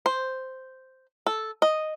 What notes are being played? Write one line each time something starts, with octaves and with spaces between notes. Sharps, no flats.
C5
A4
D#5